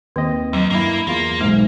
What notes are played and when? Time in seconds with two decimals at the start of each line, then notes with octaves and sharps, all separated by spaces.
0.16 D#2 D#3 C4 D#5
0.53 D#2 F#3
0.70 G2 A#3 E4
1.07 E2 A#3 F4
1.41 B1 G#2 G#3